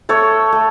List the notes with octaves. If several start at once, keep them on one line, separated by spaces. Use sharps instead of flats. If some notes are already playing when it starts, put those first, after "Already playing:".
A3 A4 C#5
A3